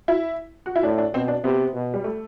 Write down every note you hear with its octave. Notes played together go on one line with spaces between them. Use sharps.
E4
F#4
E4
A2 D4
D4
B2 C4
D4
C3 B3
B2
G3
A3